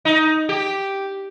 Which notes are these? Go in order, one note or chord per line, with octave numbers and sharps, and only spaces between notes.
D#4
G4